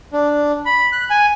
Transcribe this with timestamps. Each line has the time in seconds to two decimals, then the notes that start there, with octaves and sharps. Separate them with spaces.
0.13 D4
0.66 B5
0.92 F#6
1.10 G#5